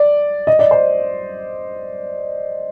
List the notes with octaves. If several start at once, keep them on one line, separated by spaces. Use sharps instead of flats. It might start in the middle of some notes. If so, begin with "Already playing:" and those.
Already playing: D5
D#5
D5
C5